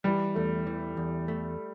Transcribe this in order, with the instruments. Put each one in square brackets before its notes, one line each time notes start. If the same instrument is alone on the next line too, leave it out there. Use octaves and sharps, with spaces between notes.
[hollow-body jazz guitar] E3 [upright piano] G3
[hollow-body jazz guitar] E2 [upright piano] A3
[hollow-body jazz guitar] E3
E2
A3